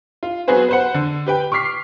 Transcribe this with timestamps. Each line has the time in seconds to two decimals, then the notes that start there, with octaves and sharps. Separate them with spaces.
0.23 F4
0.48 F#3 B3 F#4 G#4 B4 C5
0.69 B4 C5 F#5
0.94 D3
1.26 G4 B4 G5
1.52 C#6 D6 F6 B6 C7